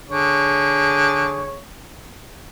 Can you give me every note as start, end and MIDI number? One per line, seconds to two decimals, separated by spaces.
0.09 1.58 50
0.09 1.58 68
0.09 1.58 73